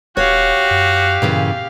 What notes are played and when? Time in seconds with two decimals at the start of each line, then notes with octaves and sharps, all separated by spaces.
0.17 D#1 F#4 G4 C#5 F5
0.71 F#2
1.22 G2 A#2 C#3 E3